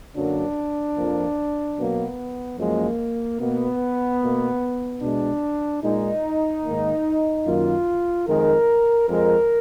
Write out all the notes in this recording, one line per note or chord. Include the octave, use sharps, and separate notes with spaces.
F#2 D3 F#3 A#3 D4
F2 F3 A#3
B2 F#3 A#3 B3
F#2 F3 G#3 A#3
B2 A#3 B3
B2 A#3
B2 G#3 D4
A#2 G#3 D#4
G#2 D#3 A#3
F#2 D#3 A#3 F4
F2 D#3 G#3 A#4
F2 F3 G#3 A#4